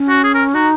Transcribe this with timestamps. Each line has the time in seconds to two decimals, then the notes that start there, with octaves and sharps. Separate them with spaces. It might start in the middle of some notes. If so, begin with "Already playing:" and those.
Already playing: C#4
0.09 F#4
0.24 G#4
0.34 A#4
0.55 D#4 F#4